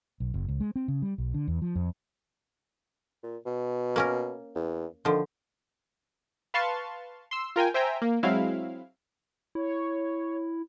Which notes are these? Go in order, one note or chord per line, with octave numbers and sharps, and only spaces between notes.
B1
F#1
C#2
G#3
C4
C#3
G3
B1
D3
E2
F3
F2
A#2
B2
A#3 C#4 A#4
E2
D3 D#3 F3
B4 F5 A5 C6 C#6 A6
C6 E6
F4 A#4 G5 G#5
C5 E5 G5 G#5 A#5
A#3
F#3 G#3 C4 E4 F5
E4 C#5